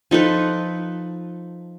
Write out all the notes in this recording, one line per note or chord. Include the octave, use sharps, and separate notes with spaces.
F3 D#4 A4 B4